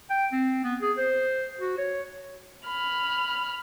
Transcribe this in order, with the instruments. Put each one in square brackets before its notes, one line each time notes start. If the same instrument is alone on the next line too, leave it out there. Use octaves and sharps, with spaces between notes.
[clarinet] G5
C4
B3
G#4
C5
F#4
C#5
[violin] B5 F6